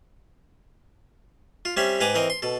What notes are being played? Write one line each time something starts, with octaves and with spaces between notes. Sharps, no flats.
F4
G3 C4 C#4 C#5 E5
G#2 B4 G5 G#5 A#5 D6
E3 C4 A#4 D#5
C6
B2 A4